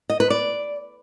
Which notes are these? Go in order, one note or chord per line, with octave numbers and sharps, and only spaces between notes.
D#5
B4
D5